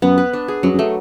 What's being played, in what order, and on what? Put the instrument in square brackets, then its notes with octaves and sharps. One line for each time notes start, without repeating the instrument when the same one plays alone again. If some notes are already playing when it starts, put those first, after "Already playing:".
[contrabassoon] F#2 [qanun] B3
[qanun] B4
D4
G#4
[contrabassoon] F#2 [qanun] F#3
[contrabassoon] F#2
[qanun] A3